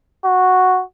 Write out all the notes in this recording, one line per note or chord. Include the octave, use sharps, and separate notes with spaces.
F#4